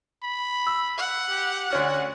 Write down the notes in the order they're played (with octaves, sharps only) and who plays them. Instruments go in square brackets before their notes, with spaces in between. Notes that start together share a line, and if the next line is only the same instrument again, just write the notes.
[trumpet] B5
[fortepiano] E6
[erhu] F#5
[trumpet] G4
[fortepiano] D2 C#4 F6 [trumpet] F#4